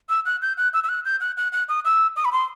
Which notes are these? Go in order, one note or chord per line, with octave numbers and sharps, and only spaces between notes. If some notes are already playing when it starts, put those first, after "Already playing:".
E6
F#6
G6
F#6
E6
E6
F#6
G6
F#6
F#6
F#6
D#6
E6
D#6
B5
C6